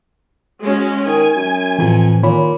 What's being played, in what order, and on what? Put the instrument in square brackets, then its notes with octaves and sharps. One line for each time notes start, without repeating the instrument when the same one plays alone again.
[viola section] G#3 C#4 F#4
[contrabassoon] D#3 [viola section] G#5
[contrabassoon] F#2
[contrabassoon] F2 [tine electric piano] A2 E3
[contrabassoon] A#2 [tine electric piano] D#3 C#5 B5